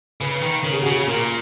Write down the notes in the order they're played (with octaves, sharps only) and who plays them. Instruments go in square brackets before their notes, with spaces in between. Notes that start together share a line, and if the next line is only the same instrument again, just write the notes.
[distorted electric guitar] C#3 [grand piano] B4
[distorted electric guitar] D#3 [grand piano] B4
[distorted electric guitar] C#3 [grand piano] A#4
[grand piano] G#4
F#4
[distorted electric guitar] C#3 [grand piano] G#4
[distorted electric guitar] A#2 [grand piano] A#4